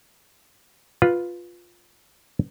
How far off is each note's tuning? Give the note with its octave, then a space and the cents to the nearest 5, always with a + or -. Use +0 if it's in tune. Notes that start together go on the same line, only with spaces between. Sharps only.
F4 +5 B4 +0